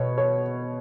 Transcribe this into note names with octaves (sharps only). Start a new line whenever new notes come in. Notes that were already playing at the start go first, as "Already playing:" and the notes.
Already playing: B2 C#5
C#5